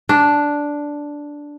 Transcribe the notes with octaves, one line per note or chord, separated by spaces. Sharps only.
D4